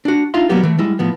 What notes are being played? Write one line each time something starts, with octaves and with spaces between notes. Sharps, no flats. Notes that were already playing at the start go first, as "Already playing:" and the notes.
D4 F#4
D4 D#4 F4 E5 F5 C6
F#3 G3 A#3 B3 G4
E3 A3
G3 G#3 E4
A2 F3 B3